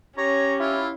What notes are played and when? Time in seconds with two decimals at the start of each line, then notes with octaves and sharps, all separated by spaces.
0.18 C#4 G4 C#5 A#5
0.60 E4 F4